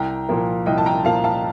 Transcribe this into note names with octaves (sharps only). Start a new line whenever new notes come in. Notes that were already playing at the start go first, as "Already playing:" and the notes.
Already playing: C2 G5 A#5
A#2 F3 A#3
C2 D#5 G5
A5
G5 A#5
A#2 F3 A#3 F5 A5
F5 A5